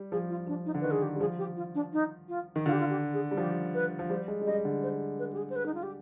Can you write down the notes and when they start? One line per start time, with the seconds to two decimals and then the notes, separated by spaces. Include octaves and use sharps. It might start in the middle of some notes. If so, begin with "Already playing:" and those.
Already playing: G3
0.12 F3 G#4
0.29 F4
0.47 F3 D4
0.66 D#4
0.74 D3
0.81 D#3 B4
0.91 G#4
1.03 G4
1.16 G3
1.20 F3 G#4
1.38 G4
1.56 F4
1.75 D4
1.93 D#4
2.29 F4
2.56 D#3
2.65 D3 F4
2.72 G4
2.80 F4
2.89 G4
3.13 G#4
3.31 G3
3.37 F3 G4
3.74 B4
3.99 F3
4.10 G3 C5
4.28 G#3
4.41 G#3
4.46 G3 D#5
4.65 D3
4.83 C5
5.19 B4
5.33 G4
5.37 G#4
5.50 C5
5.56 B4
5.66 D#4
5.74 F4
5.83 G4